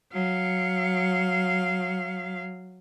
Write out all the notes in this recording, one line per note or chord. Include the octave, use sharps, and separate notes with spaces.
F#3 F5